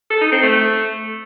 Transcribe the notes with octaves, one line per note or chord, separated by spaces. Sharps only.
A4
D#4
C4
A3